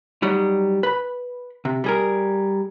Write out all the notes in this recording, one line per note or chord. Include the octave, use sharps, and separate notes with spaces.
F#3 G3 D#4
B4 B5
C3
G3 G#4 A#4